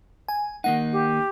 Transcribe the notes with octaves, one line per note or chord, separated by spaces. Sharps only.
G#5
D#3 A#3 D#4 F#5
G4